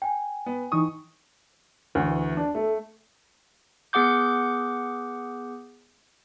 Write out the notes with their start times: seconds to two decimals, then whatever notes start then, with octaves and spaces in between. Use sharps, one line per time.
0.02 G5 G#5
0.46 B3
0.72 E3 D#4 C#6 D#6
1.95 D2 E3
2.37 D4
2.55 A3 A4
3.93 B3 G#4 F#5 D6 G6